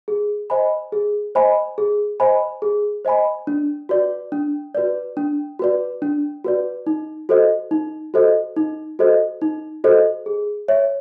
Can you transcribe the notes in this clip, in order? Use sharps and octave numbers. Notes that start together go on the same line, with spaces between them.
G#4
C5 D#5 G#5 B5
G#4
C5 D#5 G#5 B5
G#4
C5 D#5 G#5 B5
G#4
C5 D#5 G#5 B5
D4
F#4 B4 D5
D4
F#4 B4 D5
D4
F#4 B4 D5
D4
F#4 B4 D5
D#4
F#4 A4 C5 D#5
D#4
F#4 A4 C5 D#5
D#4
F#4 A4 C5 D#5
D#4
F#4 A4 C5 D#5
G#4
C#5 E5